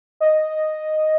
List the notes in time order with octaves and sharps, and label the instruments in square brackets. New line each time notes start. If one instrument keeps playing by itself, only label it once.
[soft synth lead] D#5